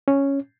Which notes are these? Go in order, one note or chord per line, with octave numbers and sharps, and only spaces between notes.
C#4